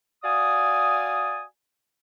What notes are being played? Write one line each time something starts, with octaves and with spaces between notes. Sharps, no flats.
F#4 D5 F5 G#5 D#6